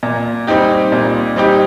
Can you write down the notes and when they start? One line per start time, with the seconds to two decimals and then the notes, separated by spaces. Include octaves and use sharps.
0.03 A#2
0.47 G3 C4 D#4 G4
0.92 A#2
1.36 G3 C4 D#4 G4